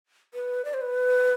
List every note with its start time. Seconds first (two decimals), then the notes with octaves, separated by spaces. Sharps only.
0.34 B4
0.65 D5
0.74 C5
0.81 B4